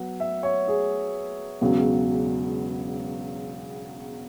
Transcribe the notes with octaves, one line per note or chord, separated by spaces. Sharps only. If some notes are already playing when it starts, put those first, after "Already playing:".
Already playing: F#3 B3 F#5
E5
C#5
G#4
E1 E2 C#3 F#3